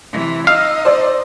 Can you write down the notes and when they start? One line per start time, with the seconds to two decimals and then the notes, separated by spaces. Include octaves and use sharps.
0.12 C3 E3
0.47 D#4 D#5 F5 E6
0.85 C5 D5